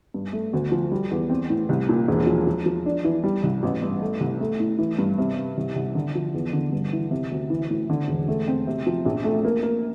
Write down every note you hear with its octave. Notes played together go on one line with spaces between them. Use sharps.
G2
A3
D2
F3
G3
E2
C4
A2
C2
A#2
E1
F3
F3
F3
D4
E3
G3
C2
A1
G2
A3
C2
A3
A2
E3
G2
C3
C3
C2
C2
D3
F3
E2
D3
G2
E3
C3
D2
E3
A2
D3
E1
A3
C4
C3
F3
A#1
A3
A#3
A#3